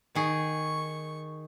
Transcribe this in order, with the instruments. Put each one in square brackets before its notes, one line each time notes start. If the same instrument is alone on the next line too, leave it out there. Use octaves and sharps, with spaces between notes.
[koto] D#3 G#4 [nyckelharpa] C#6